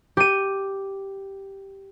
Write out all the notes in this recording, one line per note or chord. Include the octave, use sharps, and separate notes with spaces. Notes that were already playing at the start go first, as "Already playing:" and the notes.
G4 D#7